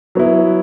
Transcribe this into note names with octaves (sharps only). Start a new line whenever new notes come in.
F#3 B3 E4